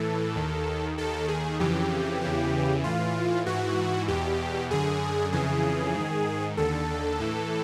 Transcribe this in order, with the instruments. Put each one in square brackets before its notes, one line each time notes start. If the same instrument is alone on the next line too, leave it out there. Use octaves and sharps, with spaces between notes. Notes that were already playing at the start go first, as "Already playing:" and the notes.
Already playing: [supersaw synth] A2 E3 A4
D#2 D#3
D#2 D#3 A4
G#4
F2 C#3 E3 G4
E2 C#3 E3
A2 E3 F4
G#2 E3 F#4
E2 B2 G4
F#2 D3 G#4
F2 C#3 E3 G#4
G#2 D#3
D#2 D3 A4
A2 E3